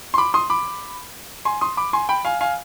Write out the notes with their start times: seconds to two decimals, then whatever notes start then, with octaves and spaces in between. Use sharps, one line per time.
0.14 C6
0.18 B5 D6
0.34 C6 D#6
0.50 B5 D6
1.45 G#5 C6
1.61 C6 D#6
1.77 B5 D6
1.93 G#5 C6
2.09 G5 B5
2.25 F5 G#5
2.41 F5 G#5